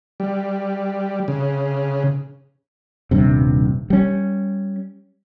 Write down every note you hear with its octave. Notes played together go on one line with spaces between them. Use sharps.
G3
C#3
D#1 G2 C3
G3 C#4